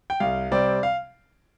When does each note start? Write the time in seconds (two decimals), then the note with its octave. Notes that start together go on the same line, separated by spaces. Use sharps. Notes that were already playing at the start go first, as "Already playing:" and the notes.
0.10 G5
0.20 C2 F5
0.51 C3 G3 C4 D5
0.83 F5